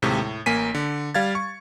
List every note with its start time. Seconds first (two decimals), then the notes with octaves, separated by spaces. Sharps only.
0.02 D#2 A2 C3 G#3
0.18 A2
0.46 A1 A#3 G#5 B6 D#7
0.75 D3
1.14 G3 F5 G#6 A6
1.35 C#6